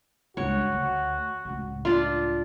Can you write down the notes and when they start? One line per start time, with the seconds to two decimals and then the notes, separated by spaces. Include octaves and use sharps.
0.37 C#2 G2 F#4 C#5
0.72 D2
1.45 C#2 A2
1.85 D4 F4